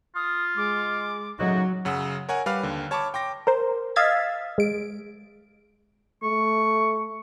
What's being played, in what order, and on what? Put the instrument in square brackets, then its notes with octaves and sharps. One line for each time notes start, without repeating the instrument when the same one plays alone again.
[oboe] F4 [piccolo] D#6
[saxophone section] G#3 [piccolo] D6
[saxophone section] C#3 A3 D#4 [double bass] F#3 [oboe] F#4
[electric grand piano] F#2 C#3 F#5 E6
A#4 C#5 F#5 G#5
G3 B4 F5 D6 F6
D#2 D3
C#5 A5 B5 C#6 D6
G5 C6 D6 A#6
[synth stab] A#4 C5
D#5 F5 E6 G#6 A6 B6
G#3 D7
[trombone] A3 [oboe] C#6